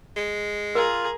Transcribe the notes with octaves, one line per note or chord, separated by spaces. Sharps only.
G#3
F4 G#4 A#4 A#5